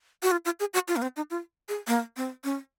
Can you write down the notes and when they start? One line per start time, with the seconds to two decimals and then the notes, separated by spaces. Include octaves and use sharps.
0.23 F#4
0.31 F4
0.45 F4
0.60 G#4
0.74 F#4
0.88 F4
0.96 A#3
1.02 C4
1.16 D#4
1.30 F4
1.69 G#4
1.87 A#3
2.17 C4
2.44 C#4